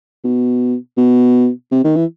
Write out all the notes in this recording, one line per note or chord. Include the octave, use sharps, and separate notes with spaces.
B2
B2
C3
D#3
E3